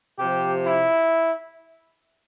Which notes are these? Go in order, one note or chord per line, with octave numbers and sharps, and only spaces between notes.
C3 F3 G4
E4